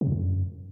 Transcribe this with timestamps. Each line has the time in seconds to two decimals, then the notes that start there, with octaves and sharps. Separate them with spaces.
0.01 C3
0.07 E2
0.12 F#2